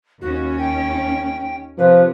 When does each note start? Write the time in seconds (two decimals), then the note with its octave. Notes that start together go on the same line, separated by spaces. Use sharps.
0.21 D#2 C#4 F#4
0.59 G5
1.78 C3 F3 B4